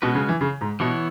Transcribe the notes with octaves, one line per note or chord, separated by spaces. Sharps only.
B2 G#3 C#4 F#4 B4
C#3
E3
C#3
G#2
B2 E3 B3 E4 C#5